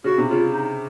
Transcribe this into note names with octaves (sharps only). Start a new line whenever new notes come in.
C#3 F#4
C3
C#3 F4
D#4